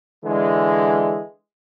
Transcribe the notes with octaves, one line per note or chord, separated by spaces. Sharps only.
D3 E3 G#3